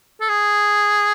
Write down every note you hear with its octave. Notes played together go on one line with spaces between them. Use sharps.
A4
G#4